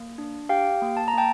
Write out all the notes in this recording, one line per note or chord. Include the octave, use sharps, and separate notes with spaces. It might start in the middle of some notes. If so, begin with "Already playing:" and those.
Already playing: A#3
D4
G4 F5 G5
A#3
A5
A#5
A#3 G5 A5